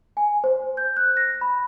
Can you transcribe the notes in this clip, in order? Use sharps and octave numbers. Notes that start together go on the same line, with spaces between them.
G#5
C5
G6
F#6
A#6
B5